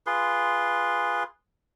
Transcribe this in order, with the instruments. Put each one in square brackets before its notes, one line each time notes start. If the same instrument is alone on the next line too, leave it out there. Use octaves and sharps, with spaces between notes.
[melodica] F4 G#4 B4 C6